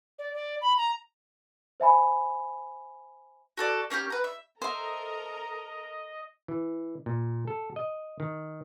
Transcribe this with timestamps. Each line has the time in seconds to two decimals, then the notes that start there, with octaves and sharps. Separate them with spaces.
0.19 D5
0.34 D5
0.61 B5
0.77 A#5
1.80 C5 E5 G#5 B5
3.57 F#4 A4 D5
3.90 A#3 C#4 F4 G4
4.10 B4 A#5
4.24 E5
4.62 A4 A#4 C5 D#5 E5 A#5
6.48 E3
7.06 A#2
7.47 A4
7.76 D#5
8.20 D#3